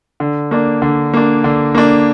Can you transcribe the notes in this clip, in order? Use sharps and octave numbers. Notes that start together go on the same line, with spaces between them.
D3
A#3 D4
D3
A#3 D4
D3
A#3 D4